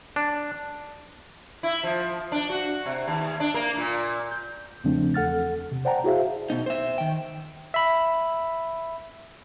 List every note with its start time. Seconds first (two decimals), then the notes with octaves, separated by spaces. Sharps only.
0.16 D4
1.63 E4
1.83 F3
2.32 D4
2.49 F#4
2.86 C3
3.08 D#2
3.40 D4
3.54 A#3
3.77 A#2
4.31 G6
4.84 E2 C#3 F3 A3 C4 D4
5.14 E2 A4 F#5 F6 A6
5.72 C3
5.85 C5 D5 F#5 G5 A5 A#5
6.04 E4 F#4 G#4 C5 E5 F5
6.50 B2 D#4
6.66 C5 E5
6.98 D#3 G5
7.74 E5 B5